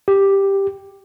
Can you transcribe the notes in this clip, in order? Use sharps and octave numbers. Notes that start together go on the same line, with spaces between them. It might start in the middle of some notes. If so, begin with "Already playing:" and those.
G4